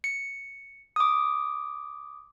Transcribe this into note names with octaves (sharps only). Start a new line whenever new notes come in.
C#7
D6 D#6